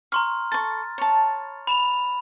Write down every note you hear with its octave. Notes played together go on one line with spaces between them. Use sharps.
A#5 C6 C#6 F6
A4 C#6 A6
C#5 A5
B5 E7 F7